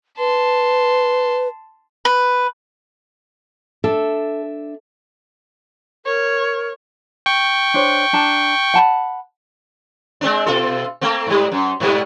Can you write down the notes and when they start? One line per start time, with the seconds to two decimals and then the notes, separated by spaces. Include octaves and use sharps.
0.19 B4 A5 C6
2.05 B4
3.84 D4 A4 E5
6.06 A#4 C#5
7.26 G5 C#6
7.74 D4 C5 C#5
8.13 D4 A5 A#5
8.74 F#5 A5 B5
10.21 G#3 C4 D4
10.46 B2 F4 A4
11.01 A3 A#3 C4
11.27 G#2 G3
11.52 F#2
11.80 G#2 B2 G3